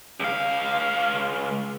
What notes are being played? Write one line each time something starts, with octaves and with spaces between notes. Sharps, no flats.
C#2 F5